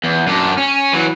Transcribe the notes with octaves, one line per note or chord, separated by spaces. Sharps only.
E2
F#2 D4
C#4
E3 F#3